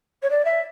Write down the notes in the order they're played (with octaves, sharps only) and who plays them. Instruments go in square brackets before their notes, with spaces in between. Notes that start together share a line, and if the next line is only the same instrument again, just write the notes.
[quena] C#5
D5
E5